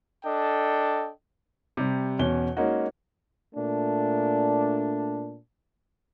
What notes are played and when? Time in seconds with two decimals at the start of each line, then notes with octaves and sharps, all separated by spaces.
0.24 D4 A4 D#5 G5
1.77 C3 G3
2.19 E2 B2 C#4 G7
2.57 G#3 A#3 C#4 D#4 F#4
3.55 A#2 A3 D4